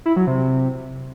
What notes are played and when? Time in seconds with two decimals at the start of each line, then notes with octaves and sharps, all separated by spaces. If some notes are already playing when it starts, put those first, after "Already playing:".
0.06 E4
0.16 F#3
0.27 C3